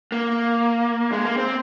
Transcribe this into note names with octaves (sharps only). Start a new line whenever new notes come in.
A#3
G#3
A#3
C4